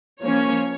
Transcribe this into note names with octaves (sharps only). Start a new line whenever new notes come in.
F3 A#3 C#4 C#5